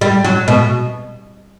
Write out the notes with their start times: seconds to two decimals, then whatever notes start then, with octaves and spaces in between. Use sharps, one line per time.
0.01 G3
0.25 F#3
0.48 B2